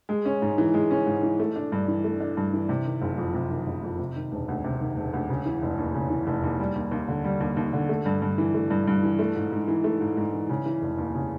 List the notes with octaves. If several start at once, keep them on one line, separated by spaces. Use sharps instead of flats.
G#3
C#4
G#2
E3
G#3
C#4
G#2
E3
A3
D4
G2
E3
A3
D4
G2
E3
C3
D#3
F#1
F2
C3
D#3
F#1
F2
C3
D#3
E1
D2
C3
D#3
E1
D2
C#3
E3
F1
D#2
C#3
E3
F1
D#2
G3
D#2
D#2
D3
G3
D#2
D#2
D3
A3
G2
G2
E3
A3
G2
G2
E3
A3
G#2
G#2
E3
A3
G#2
G#2
E3
C#3
E3
F1
D#2
C#3